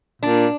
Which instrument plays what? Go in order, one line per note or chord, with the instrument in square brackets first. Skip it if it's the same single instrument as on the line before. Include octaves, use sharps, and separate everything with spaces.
[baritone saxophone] A#2 [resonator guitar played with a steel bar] D4